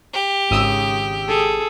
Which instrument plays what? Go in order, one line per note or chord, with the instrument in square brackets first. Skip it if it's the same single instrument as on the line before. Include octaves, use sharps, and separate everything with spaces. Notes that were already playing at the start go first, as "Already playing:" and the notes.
[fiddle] G4
[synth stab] G#1 D#6 E6 [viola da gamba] C#3
[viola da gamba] G#4 A4